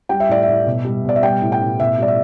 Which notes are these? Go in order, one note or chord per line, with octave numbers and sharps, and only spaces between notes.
G3 G5
E5
A2 D5
E5
A2
B2
G3
B2 D5
E5
G3 G5
A2
G5
A2
B2 E5
G3 D5
E5